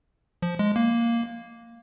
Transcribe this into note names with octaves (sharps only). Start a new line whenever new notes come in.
F3
G#3
A#3